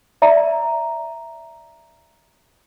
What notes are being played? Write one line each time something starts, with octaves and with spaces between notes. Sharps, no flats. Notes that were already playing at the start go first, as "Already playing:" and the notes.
D5 E5 A#5